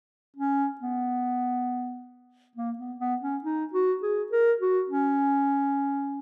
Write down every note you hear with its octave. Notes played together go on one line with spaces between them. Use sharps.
C#4
B3
A#3
B3
B3
C#4
D#4
F#4
G#4
A#4
F#4
C#4